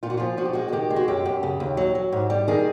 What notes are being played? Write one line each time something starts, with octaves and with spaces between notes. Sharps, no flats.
A#2 F4
F#4
F3 F4
F3 F#4
G4
G#3 F#4
F#4
D#3 G4
G#3
F#4
F#2 G4
F#2
C#3
D#2
F#3
F#3
G#2
G3
D#3 G#4